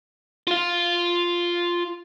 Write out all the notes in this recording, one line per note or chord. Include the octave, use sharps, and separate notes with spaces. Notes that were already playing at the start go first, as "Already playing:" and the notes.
F4 F5